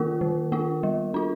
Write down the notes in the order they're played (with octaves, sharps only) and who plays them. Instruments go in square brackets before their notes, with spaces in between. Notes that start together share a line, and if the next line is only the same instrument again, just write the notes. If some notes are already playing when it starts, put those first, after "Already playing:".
Already playing: [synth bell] D#3 A#3 F4 A#4
D#3
A#3 F4
G3
D4 F4